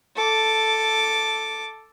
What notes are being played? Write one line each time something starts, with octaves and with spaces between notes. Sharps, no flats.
A4 D6